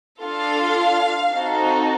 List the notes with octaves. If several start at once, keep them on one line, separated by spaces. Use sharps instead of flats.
D4 F4 A4 F5
C4 D#4 F#4 A4